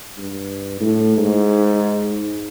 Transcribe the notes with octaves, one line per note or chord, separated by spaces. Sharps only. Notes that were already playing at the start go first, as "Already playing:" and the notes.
G2
A2
G#2